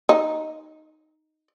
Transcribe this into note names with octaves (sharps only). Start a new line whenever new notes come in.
D#4